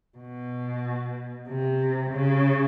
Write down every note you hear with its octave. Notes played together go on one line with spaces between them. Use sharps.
B2
C3
C#3